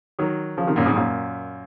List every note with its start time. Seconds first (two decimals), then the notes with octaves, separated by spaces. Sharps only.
0.19 D#3 F#3
0.57 C#3 F3
0.67 C3 D#3
0.76 F#2 A#2
0.86 F2 G#2
0.96 F#2 A#2